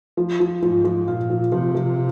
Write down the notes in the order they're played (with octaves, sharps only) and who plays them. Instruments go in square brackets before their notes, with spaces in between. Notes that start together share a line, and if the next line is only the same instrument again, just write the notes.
[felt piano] F3
F3
[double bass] G#2 [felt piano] F3
[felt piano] F3
[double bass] A#2 [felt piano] F4
[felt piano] F3
[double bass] C3 [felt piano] F3
[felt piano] F3